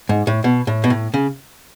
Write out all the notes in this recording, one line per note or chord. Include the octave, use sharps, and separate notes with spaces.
G#2
A2
B2
A2
B2
A2
C#3